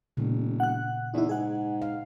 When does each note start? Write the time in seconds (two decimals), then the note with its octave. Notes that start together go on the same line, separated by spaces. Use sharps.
0.17 E1 A#2 C#3
0.60 F#5 F#6
1.14 E2 D#4 E4
1.29 G#2 G#4 F#5
1.82 F5